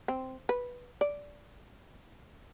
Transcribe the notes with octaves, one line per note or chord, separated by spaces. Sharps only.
C4
B4
D5